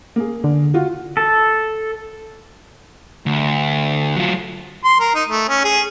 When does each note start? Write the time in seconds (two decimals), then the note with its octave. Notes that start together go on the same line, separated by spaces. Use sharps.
0.16 A#3 G#4
0.44 D3
0.74 F4 F#4
1.17 A4
3.26 D2
4.17 F#3 F4
4.84 C6
5.00 A#4
5.15 D#4
5.29 A3
5.49 C#4
5.64 G#4